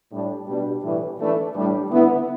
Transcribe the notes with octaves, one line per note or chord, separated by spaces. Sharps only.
A2 G3 D4
B2 G3 D4
A2 E3 G3
E3 A3 D4
A2 G3 D4
D3 B3 E4